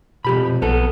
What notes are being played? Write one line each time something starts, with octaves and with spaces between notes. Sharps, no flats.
F2 B2 G4 B5
B2
B1 B3 A4